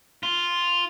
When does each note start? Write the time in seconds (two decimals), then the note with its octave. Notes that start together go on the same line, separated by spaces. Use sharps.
0.23 F4